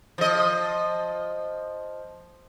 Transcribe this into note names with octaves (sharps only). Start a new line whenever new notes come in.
F3 D#5